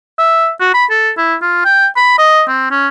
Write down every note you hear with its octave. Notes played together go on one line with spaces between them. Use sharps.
E5
F#4
B5
A4
E4
F4
G5
B5
D#5
C4
C#4